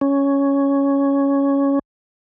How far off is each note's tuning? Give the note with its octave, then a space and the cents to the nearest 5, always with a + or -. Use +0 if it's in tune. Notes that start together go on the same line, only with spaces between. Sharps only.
C#4 +5